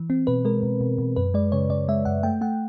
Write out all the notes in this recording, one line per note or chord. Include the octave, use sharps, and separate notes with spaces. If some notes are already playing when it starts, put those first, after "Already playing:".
Already playing: E3
C4
B2 B4
G#3 A#4
B2
B2
B2
F#2 B4
G#3 D5
C#3 C#5
C#3 D5
G#3 E5
F#2 F#5
A3 G5
A3 F#5